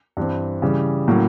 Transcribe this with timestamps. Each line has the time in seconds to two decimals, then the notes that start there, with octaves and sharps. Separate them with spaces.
0.17 G2 E3 G3 C4
0.62 C#3 E3 G3
1.08 A2 F#3 A#3 C#4